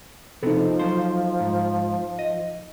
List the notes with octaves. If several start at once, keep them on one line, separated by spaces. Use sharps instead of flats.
C3 F3 B3 C4 D#4 A4
F#3 C5
G#2
D#5